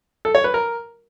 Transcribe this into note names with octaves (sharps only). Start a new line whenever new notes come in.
A4
C#5
B4
A#4